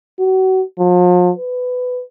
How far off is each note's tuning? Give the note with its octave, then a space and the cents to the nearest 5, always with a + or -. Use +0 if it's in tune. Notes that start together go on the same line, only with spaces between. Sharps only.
F#4 +30
F3 +40
B4 +15